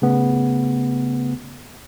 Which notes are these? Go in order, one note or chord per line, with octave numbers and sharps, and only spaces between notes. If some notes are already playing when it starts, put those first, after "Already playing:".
C#3 A3 B3